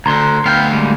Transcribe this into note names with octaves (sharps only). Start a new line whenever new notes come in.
D2 D3 A#5 C6
D2 B3 F5 G5 G6
G3 G#3 A#3